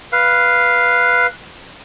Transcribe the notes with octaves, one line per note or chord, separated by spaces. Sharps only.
B4 F5